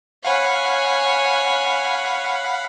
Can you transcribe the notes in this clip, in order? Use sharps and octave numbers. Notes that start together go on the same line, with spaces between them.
C#5 F5 F#5 G#5 B5